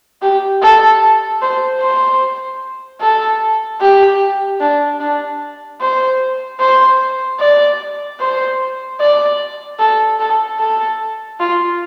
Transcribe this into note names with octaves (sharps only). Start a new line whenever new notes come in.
G4
A4
C5
C5
A4
G4
D4
D4
C5
C5
D5
C5
D5
A4
A4
A4
F4